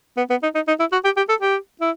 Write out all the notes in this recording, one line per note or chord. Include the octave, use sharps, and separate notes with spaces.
B3
B3
D#4
D#4
D#4
E4
F#4
G4
G4
A4
G4
E4